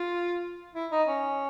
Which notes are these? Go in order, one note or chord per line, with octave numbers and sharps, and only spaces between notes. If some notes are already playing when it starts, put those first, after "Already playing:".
Already playing: F4
E4
D#4
C#4